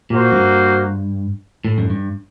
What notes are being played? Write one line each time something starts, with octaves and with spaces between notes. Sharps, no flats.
A#2 A#3 F#4 C5
F#2
G2
A2
F#2
G2